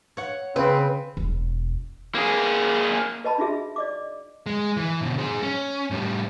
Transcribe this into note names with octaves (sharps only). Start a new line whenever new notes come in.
C#5 F#5
C#3 C4 B4
E1
A#3 G#4
B4 D#5 A5 B5
D4 D#4 F4 F#4 G#4 E5
D5 D#5 D6
G#3
E3
B2 D3
G#4 C5
C#4
A2 G3